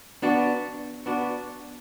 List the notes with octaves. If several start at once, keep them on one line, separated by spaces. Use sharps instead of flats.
B3 D4 F#4
B3 D4 F#4